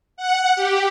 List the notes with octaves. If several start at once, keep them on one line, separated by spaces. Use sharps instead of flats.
F#5
G4